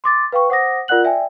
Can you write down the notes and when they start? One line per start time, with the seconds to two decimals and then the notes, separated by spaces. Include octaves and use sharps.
0.04 C6 D6 A6
0.32 B4 F5 G5 C#6
0.49 C5 F#5 D6 D#6 A#6
0.88 F4 A#4 D5 F#5 F#6 F#7
1.04 D5 E5 G5 G#5